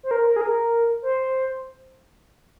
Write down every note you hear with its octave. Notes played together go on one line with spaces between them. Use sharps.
C5
A#4
A#4
G#4
A#4
C5